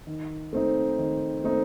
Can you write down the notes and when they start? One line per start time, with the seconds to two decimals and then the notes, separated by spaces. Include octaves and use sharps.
0.07 D#3
0.53 A3 C4 D#4
0.98 D#3
1.44 A3 C4 D#4